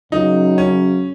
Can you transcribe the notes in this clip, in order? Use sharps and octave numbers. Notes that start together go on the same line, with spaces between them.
F#2 C#3 F#3 D#4
C#4